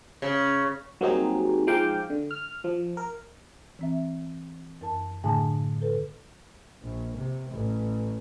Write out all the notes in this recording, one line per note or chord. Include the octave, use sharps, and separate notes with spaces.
C#3
F#3 G3 A#3 C4 D#4 G#4
F3 G#3 D#4 F5 G5 D6
D3
F6
F3
A#4
E3 C4 E5
F#2 A#4 A5
A2 D3 G#4 G#5 A5
A4 B4
A#1
C3
A1